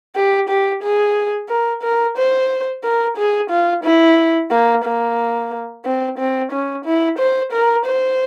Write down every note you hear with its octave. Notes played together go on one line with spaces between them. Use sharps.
G4
G4
G#4
A#4
A#4
C5
A#4
G#4
F4
E4
A#3
A#3
C4
C4
C#4
E4
C5
A#4
C5